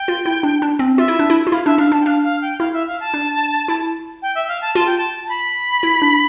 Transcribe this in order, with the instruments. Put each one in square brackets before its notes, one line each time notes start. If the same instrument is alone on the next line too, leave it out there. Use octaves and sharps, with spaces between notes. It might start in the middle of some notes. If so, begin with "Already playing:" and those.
Already playing: [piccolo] G5
[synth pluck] F4
E4
D4
D4
C4
[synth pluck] F4 [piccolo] E5
[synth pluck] E4
D4
E4
F4
[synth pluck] E4 [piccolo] F5
[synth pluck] D4 [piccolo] E5
[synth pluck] D4 [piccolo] F5
[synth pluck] D4 [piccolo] A5
[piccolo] G5
[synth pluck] D4 [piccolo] F5
[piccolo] F5
G5
[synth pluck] E4 [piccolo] F5
[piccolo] E5
F5
A5
[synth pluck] D4
E4
[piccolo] G5
E5
F5
A5
[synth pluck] F4 [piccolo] A5
[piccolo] G5
A5
A5
B5
[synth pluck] E4
D4